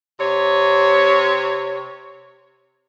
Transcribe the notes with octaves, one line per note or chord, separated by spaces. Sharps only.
C3 C#5